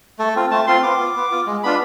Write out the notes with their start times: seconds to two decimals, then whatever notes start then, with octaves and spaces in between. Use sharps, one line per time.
0.19 A3 A4
0.36 C4 F4
0.51 A3 A5
0.67 C4 F4 C6
0.83 B3 D6
1.00 F4
1.16 B3
1.31 F4
1.47 G#3
1.63 B3 D4 F4 B5